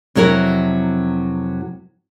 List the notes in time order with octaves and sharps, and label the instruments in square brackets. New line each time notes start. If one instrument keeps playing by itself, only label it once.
[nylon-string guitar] F2 C3 F#3 E4 A#4